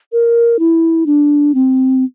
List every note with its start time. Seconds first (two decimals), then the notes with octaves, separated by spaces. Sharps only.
0.12 A#4
0.59 E4
1.06 D4
1.55 C4